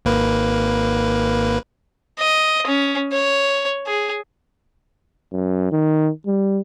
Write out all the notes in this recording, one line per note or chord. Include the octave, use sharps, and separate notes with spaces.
G#1 A#3 B4
D#5
C#4
C#5
G#4
F#2
D#3
G3